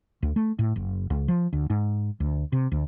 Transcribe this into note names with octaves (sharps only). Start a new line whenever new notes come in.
D2
A3
A2
F#1
C#2
F3
D2
G#2
D2
C3
D2